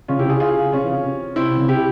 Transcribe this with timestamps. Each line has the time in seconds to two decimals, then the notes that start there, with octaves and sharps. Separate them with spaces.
0.08 C#3 C#4 F4
0.18 C3 E4 G4
0.28 C#3 F4 G#4
0.40 F4 G#4
0.72 C3 C#4 F4
0.84 E3
0.94 C#3
1.04 C3
1.36 C4 E4
1.58 C#3
1.68 C3 E4 G4